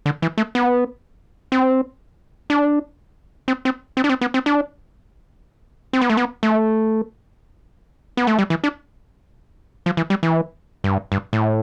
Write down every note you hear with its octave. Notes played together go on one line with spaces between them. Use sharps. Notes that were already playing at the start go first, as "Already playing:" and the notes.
D3
E3
A3
B3
C4
D4
C4
C4
C4
D4
C4
B3
C4
D4
C4
B3
A3
B3
A3
B3
A3
G3
E3
D4
F3
E3
G3
E3
G2
G2
A2